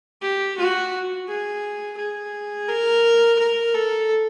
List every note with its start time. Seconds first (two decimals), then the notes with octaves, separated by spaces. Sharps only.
0.22 G4
0.57 F#4
1.28 G#4
1.98 G#4
2.69 A#4
3.39 A#4
3.74 A4